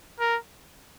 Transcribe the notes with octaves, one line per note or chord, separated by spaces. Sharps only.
A#4